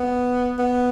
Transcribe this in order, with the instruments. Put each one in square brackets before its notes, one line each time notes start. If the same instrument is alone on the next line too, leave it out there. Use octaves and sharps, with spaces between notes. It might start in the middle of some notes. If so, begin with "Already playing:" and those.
Already playing: [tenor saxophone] B3
B3